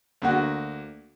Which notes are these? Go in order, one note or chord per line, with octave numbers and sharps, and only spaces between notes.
D2 A#3 F#4